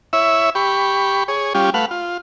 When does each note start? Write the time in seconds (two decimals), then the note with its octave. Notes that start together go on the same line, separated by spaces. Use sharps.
0.13 E4 C#5 E5
0.55 G4 B5 C#6
1.28 G#4 C#5
1.55 G3 C#4 F4 G4
1.74 A3 B4 F5 F#5
1.91 F4